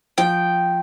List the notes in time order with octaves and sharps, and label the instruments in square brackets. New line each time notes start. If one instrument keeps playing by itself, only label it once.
[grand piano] F3 [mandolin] G5